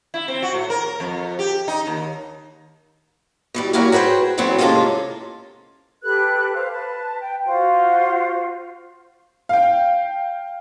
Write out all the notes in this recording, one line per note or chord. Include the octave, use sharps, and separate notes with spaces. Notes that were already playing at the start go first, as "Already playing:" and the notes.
E4
C4
F#4
A2
A#4
F2
G4
D#4
D#2
B2 E3 G3
G3 A#3 E4 F#4 A#4 C#5
F#4 G#4 B4 C5 G5
E3 F#3 A3 B3 C4
C3 G#3 A#3 C#4 F4 A4
G4 A4 B4 F#6
C5 F5
B4 A5
G5
F4 F#4 C5
F5 G5